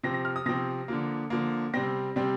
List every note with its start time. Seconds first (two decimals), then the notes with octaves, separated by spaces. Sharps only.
0.03 C3 F3 C4 A#6
0.14 A#6
0.25 F6
0.36 D#6
0.46 C3 F3 C4 A#6
0.88 D3 F3 A#3
1.30 D3 F3 A#3
1.74 C3 G3 C4 A#6
2.16 C3 G3 C4